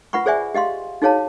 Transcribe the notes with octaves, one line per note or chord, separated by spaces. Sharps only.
F4 B4 F#5 B5 C#6
G#4 C5 D5 E5 G#5
G4 D#5 F5 C6
D#4 F#4 G#4 C#5 F5 A5